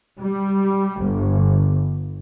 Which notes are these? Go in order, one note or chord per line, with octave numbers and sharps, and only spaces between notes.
G3
G1